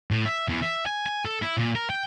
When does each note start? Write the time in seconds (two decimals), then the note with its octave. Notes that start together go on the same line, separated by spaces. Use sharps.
0.11 A2
0.26 E5
0.48 E2
0.62 E5
0.86 G#5
1.06 G#5
1.25 A4
1.42 E4
1.57 A#2
1.75 A#4
1.90 G5